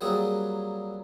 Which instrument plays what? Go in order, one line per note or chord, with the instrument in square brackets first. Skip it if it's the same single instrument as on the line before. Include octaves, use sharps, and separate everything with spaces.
[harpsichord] F#3 G3 A#3 C4 F#4 G#4